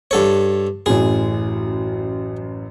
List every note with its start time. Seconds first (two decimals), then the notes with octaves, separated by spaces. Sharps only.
0.11 G2 A4 C#5
0.86 A1 F#2 G#4